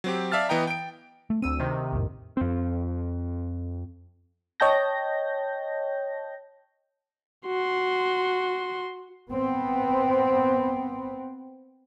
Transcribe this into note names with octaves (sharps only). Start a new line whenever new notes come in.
F#3 C4 G4
D5 E5 F5 A5 F6 A6
E3 B3 D#5 G5 A#5
G5 D7
A3
D2 C4 E6 D#7
C3 D#3
B1 F2 A2
F2 C4
C#5 D#5 G5 A5 G6 A#6
F#4 C6
B3 C4